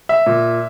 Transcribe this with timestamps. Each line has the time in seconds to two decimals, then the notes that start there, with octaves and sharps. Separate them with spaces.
0.09 E5
0.26 A#2